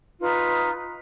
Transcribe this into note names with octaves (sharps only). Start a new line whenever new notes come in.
D#4 F4 B4